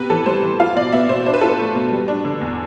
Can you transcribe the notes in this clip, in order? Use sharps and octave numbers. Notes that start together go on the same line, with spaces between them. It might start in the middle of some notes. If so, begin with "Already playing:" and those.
Already playing: C3 B3 B4
E3 A4
G3 C5
E3
F4 F5
B2 D5
B3 E5
B2 C5
D4 C5
B4
F4 A4
B4
A3
B2
G3
D4
D3
E2